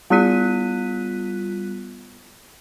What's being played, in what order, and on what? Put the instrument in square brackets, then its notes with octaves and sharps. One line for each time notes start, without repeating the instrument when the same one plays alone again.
[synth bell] G3 B3 F4 F#6 B6 D#7